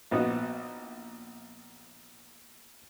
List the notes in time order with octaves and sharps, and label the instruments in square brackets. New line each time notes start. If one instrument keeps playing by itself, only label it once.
[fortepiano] A#1 B3 D#4 F#4